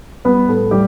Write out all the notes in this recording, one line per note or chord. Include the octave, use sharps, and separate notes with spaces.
G3 B3 B4
A2 A3 A4
G3 G4